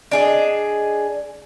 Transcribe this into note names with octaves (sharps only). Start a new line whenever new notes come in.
D4 G#4 D#5